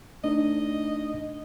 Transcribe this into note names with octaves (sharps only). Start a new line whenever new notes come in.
A3 D4 D#4 D#5